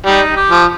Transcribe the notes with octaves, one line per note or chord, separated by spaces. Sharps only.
G3 D#4
G4
F3